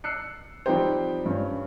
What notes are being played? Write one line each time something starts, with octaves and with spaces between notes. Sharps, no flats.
E6 F#6 C7 C#7
F3 G3 C4 D#4 G4 C5
G2 C#4